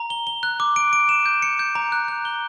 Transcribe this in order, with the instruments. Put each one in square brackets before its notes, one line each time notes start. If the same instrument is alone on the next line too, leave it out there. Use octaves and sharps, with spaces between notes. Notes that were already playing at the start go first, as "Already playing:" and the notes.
Already playing: [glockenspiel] A#5
G7
G7
F#6
D6
D7
D7
E7
G6
C#7
G6
A#5
F#6
F#6
G7